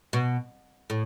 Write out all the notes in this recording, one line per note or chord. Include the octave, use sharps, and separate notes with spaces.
B2
A2